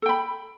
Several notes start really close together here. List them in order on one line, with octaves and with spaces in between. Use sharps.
A4 G5 B5